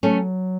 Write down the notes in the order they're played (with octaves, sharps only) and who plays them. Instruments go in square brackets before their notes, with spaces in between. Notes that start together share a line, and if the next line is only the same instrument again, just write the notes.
[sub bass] F#3 [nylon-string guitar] A3 C#4